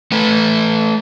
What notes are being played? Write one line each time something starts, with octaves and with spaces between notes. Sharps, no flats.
A3 B4